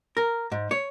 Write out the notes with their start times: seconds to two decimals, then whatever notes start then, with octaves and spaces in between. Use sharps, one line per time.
0.17 A#4
0.52 G#2
0.71 C#5